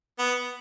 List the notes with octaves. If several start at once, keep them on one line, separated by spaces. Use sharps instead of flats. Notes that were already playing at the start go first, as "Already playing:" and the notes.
B3